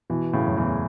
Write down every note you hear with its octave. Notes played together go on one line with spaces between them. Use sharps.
B2 E3
A2 C#3
F#2
E2 A2